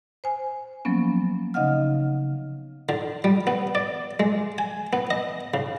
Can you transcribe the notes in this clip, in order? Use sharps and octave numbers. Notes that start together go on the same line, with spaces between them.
C5 G#5
F3 F#3 A#3 B3 C#4
C#3 D#4 D#5 F5 F#5 F6
D3
G3
B3
D5
G#3
G#5
B3
D#5
C#3